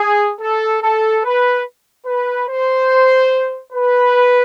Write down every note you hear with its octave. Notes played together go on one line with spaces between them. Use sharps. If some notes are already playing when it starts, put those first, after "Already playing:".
Already playing: G#4
A4
A4
B4
B4
C5
B4